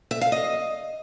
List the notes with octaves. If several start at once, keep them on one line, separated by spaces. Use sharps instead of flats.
E5
F5
D#5